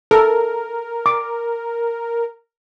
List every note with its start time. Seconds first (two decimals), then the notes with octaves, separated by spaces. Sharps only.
0.11 A4 A#4
1.06 D6